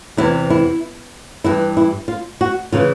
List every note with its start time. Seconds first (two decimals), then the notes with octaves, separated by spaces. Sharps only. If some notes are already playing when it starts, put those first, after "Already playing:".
0.17 E2 C3 E3 E4
0.50 E4
1.44 G2 E3 E4
1.77 E4
2.08 F4
2.41 F#4
2.72 C#3 E3 F4